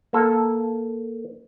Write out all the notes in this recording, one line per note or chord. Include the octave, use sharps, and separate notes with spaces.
A#3 A4